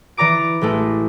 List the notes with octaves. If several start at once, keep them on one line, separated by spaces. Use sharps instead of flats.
E3 D5 A#5 D6 D7
A1 G#3 A3